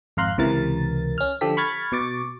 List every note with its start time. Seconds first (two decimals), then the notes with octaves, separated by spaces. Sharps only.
0.17 G#1 F2 F5 A#5 C6 F#6
0.38 C#2 C3 E3 A#4 A6
1.18 C#4 F6
1.41 D3 F3 G4 A4 B6
1.57 B5 C#6 F6 G#6 A6
1.92 B2 C#6 D6 A6